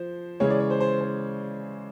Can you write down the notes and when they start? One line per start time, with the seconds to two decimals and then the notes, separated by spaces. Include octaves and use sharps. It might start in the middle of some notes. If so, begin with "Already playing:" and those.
Already playing: F3 C5
0.40 C#3 E3 G#3 C#5
0.50 D5
0.60 C#5
0.70 C5
0.81 C5
1.01 C5